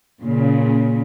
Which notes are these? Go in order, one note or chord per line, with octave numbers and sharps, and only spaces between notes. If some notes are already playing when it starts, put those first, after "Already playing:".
A#2 C#3